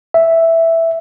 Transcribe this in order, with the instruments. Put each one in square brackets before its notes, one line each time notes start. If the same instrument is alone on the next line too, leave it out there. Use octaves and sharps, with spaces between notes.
[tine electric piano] E5